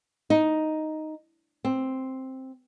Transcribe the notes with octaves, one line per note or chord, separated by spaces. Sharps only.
D#4
C4